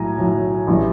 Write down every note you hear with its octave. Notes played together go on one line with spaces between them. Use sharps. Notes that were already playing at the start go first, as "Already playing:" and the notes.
Already playing: B1 A2 F#3 G#5 A#5
B1 A2 F#3
A1 E3 G3